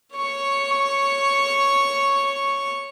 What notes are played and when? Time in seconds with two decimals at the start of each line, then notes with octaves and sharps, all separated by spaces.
0.16 C#5 C#6